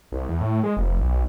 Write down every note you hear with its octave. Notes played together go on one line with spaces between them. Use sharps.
C2
E2
A2
G#3
F1
B1